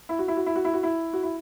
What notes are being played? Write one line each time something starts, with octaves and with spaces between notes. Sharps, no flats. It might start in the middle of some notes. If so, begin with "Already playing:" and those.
E4
F#4
E4
F#4
E4
F#4
E4
F#4
E4
F#4
E4